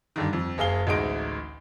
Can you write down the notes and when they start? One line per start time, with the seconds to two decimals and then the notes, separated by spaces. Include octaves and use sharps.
0.16 G2 D3 D#3
0.33 F2
0.58 F#1 G#4 F5 G7
0.87 A1 D2 G#3 D#4 D7